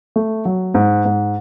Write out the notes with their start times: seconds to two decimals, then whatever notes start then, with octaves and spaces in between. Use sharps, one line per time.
0.16 A3
0.45 F#3
0.75 G#2
1.05 G#2